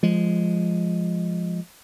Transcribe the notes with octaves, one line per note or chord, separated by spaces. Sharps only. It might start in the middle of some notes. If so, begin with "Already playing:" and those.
F3 G#3